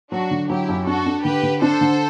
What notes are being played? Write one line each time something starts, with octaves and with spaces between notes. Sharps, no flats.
F#3 D4 F#4
D3
F#3 E4 G4
F#2
D4 F#4 A4
D4
D3 G4 B4
D3
D4 A4 C5
D3